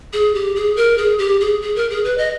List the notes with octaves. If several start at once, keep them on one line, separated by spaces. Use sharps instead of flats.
G#4
G4
G#4
A#4
G#4
G4
G#4
G#4
A#4
G#4
B4
D#5